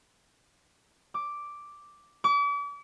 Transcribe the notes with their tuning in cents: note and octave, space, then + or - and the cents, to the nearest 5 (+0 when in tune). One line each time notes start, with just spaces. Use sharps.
D6 +0
D6 -40